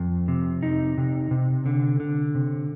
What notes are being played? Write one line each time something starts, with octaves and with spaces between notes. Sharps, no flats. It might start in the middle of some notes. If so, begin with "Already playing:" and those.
Already playing: F2
C3
D#4
C3
C3
D3
D3
C3